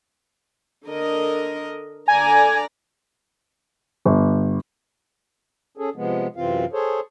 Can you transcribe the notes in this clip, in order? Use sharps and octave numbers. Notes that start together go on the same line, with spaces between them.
D3 A#4 D#5
D3 D5 G#5 A#5
G1
C#4 G#4 A4
C3 F3 G#3 B3
F#2 C3 E3 C4 F4 F5
G#4 A4 C5 C#5